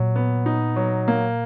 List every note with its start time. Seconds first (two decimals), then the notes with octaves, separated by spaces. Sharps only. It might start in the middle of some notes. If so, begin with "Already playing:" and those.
Already playing: A#2 F#3
0.16 B3
0.46 D#4
0.76 F#3
1.08 A#3